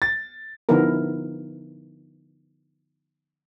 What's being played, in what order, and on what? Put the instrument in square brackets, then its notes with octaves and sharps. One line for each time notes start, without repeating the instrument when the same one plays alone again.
[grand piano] A6
[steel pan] D3 F3 B3 D#4 E4 A#4